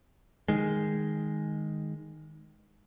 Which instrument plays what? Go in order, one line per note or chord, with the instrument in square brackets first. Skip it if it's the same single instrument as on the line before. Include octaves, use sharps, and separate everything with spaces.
[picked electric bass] D#3 G#3